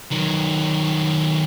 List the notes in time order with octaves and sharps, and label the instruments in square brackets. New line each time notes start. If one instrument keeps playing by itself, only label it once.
[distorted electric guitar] D#3 F#3